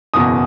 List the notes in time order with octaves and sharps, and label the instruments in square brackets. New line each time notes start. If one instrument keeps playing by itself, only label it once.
[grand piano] F#1 E2 B2 D#6